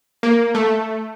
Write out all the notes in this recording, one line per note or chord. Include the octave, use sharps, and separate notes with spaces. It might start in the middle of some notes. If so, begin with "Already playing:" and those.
A#3
A3